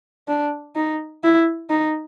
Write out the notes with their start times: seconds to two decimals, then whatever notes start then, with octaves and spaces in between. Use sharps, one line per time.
0.28 D4
0.76 D#4
1.24 E4
1.70 D#4